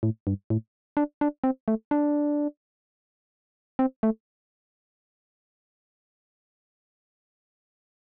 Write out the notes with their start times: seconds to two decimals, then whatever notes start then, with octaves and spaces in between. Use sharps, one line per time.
0.03 A2
0.27 G2
0.50 A2
0.97 D4
1.21 D4
1.44 C4
1.68 A3
1.91 D4
3.79 C4
4.03 A3